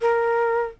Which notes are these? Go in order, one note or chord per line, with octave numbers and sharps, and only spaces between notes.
A#4